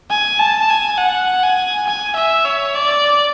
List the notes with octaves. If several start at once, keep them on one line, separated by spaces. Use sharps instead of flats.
G#5
A5
G#5
F#5
G#5
G#5
E5
C#5
D5